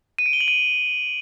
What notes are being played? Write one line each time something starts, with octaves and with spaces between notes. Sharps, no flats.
D#7
D7
G7
F#7
D#7